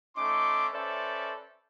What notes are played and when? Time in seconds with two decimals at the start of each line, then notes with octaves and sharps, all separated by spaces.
0.16 A3 C#4 D#4 C6 D6
0.73 C#4 A4 B4 C5 D5 E5